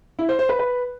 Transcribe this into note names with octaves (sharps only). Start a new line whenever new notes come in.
E4
C5
C5
B4
B4